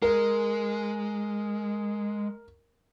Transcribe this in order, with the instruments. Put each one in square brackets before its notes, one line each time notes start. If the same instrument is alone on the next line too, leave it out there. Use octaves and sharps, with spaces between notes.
[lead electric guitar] G#3 [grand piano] A#4